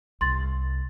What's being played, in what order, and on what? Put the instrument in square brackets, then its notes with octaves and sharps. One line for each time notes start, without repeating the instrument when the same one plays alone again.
[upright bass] C2 [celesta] C6 A6